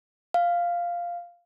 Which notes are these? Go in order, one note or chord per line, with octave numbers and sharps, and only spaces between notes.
F5